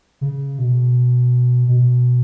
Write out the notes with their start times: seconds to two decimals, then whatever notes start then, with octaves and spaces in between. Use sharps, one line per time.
0.21 C#3
0.58 B2
1.68 B2